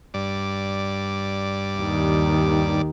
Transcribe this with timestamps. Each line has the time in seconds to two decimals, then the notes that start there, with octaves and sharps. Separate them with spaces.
0.14 G2 D5
1.79 D#2 D#3